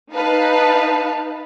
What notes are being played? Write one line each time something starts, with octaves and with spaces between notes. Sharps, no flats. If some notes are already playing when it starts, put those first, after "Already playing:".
D#4 B4 F5 A5